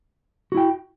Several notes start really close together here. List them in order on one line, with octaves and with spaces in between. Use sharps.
F#4 E4 G5